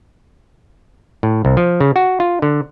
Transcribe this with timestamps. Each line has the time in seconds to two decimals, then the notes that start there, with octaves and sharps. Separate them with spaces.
1.23 A2
1.45 C2
1.57 F3
1.80 C#3
1.96 F#4
2.20 F4
2.42 D3